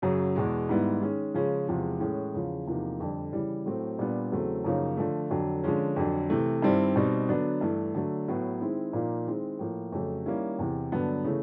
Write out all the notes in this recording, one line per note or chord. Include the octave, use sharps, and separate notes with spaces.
F#2 C#3 F#3
E2 B2 G#3
G#2 D#3 G3 B3 E4
D#3 G#3 C#4
C#3 F3 G#3 C#4
E2 C3 F3 G#3
A2 E3 G#3 C#4
E2 C#3 F3
E2 C3 F3 A#3 D#4
F2 D3 G3
C#3 E3 G3
A2 F#3 A3 C4
A#2 G3 B3 D4
E2 C#3 F#3 A3 C4
F#2 C#3 F3 A#3 D#4
D3 F3 A3
F2 D3 F#3
D3 F3 G#3 C#4
F2 D3 F#3
C3 E3 A3
G2 D#3 G3 C4 E4
B2 G3 C4 D#4
D3 F#3 B3 D4
G2 E3 A3
D3 F#3 A3
A2 F#3 B3 E4
D#3 G#3 C4 E4
A#2 F3 A#3 D#4
D#3 G#3 C4 E4
A2 F3 A#3
F2 C#3 F#3 A3
D#3 G3 A#3 C#4 E4
E2 C3 E3
G2 D3 F#3 B3
C#3 E3 A3